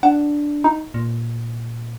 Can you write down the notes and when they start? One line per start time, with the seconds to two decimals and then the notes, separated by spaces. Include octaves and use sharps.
0.03 D4 F#5
0.64 D#4
0.94 A#2